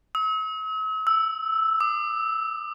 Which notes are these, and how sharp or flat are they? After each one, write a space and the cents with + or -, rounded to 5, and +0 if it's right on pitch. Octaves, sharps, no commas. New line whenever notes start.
E6 -45
E6 -5
D6 +40